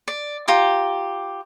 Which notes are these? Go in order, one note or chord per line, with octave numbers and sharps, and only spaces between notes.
D5
F4 G4 A#5 D6